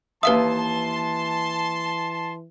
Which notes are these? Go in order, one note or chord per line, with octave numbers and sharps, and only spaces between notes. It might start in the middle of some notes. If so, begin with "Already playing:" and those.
D#2 E3 B4 E5 F5 A5 C6 D#6